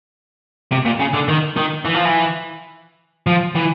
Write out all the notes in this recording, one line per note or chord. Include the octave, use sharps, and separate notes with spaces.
C3
A#2
C#3
D3
D#3
D#3
E3
F3
E3
F3
E3